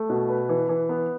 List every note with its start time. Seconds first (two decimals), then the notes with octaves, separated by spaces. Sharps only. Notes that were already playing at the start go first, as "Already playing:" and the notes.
Already playing: A3
0.10 B2
0.29 B4
0.49 E3
0.69 E3
0.89 B3